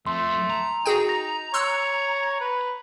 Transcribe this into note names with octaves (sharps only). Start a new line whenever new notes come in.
F2 A3 C6
A#5
D#4 F#4 G#4 G5
A#6
C#5 C6 E6 F#6
B4